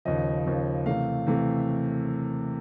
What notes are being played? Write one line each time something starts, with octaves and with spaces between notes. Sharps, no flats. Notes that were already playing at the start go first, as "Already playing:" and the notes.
D#2 C#3 F3 D#5
D#2 C#3 F3
C3 E3 A3 F5
C3 E3 A3